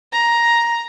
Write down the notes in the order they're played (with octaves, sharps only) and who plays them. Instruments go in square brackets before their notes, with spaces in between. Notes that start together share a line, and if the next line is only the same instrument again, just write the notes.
[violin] A#5